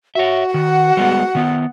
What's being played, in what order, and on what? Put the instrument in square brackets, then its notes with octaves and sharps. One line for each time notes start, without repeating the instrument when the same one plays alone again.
[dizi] F#4 [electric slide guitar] C#5 E5
[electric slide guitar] D#3 [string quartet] F#5
[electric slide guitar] G3 G#3 B3
D#3 B3